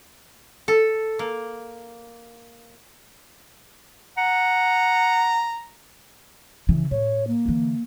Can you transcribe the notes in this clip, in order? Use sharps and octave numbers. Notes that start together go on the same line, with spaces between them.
A4
A#3
F#5 A#5
C#3 E3
A2 C#5
A#3
D3 E3